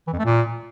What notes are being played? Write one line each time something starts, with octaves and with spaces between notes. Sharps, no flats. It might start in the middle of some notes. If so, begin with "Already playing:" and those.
E3
F2
A3
A#2